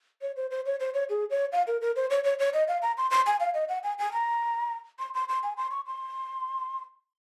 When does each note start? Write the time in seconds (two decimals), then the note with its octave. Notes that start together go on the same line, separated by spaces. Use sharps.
0.22 C#5
0.36 C5
0.51 C5
0.66 C#5
0.80 C5
0.94 C#5
1.10 G#4
1.30 C#5
1.52 F5
1.67 A#4
1.81 A#4
1.96 C5
2.10 C#5
2.24 C#5
2.39 C#5
2.54 D#5
2.68 F5
2.82 A#5
2.98 C6
3.11 C6
3.26 G#5
3.40 F5
3.54 D#5
3.69 F#5
3.83 G#5
3.99 G#5
4.13 A#5
4.99 C6
5.14 C6
5.29 C6
5.43 G#5
5.57 C6
5.71 C#6
5.87 C6